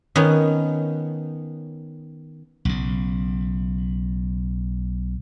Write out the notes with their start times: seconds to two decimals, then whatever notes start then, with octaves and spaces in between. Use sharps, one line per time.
0.16 D#3 B3 C#4
2.65 B1 C#3